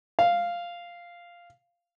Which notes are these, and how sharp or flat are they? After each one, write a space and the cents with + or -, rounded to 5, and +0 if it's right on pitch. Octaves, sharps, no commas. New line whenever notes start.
F5 -5